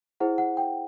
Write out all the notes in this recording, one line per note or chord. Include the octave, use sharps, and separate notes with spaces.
E4 G#4 C5 F#5
F#5
G5